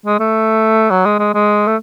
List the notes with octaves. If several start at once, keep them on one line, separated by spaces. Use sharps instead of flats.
G#3
A3
F#3
G#3
G#3
G#3
A3